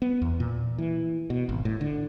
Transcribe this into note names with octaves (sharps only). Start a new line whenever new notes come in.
B3
E2
A#2
E3
B2
G#1
A2
D3